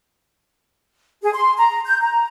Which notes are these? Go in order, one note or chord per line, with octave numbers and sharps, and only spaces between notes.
G#4
C6
A#5
G6
A#5